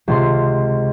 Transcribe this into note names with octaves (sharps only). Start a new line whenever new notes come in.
C#2 C3 C6